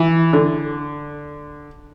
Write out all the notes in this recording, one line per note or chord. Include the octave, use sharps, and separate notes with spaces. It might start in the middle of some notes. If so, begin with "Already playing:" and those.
Already playing: E3
D3